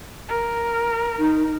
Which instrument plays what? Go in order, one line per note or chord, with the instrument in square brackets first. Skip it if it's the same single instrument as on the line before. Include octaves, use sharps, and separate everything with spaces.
[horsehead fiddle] A#4
[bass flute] D#4